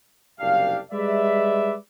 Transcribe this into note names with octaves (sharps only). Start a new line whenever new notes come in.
F#1 C2 D4 G4 F5
G3 G#3 B4 D5 E5